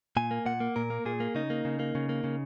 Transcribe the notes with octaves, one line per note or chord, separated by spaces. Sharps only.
A#2 G#5
A#3
A#2 F#5
A#3
A#2 A#4
A#3
A#2 G#4
A#3
C#3 D#4
A#3
C#3
A#3
C#3
A#3
C#3